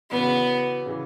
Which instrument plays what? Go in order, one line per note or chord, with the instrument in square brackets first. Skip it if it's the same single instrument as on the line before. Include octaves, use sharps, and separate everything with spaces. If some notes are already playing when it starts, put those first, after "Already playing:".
[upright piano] E2 C#3 F#3 [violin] B3
[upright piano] C#3 E3